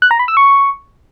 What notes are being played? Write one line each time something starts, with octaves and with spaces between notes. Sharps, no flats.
F#6
A#5
B5
E6
C#6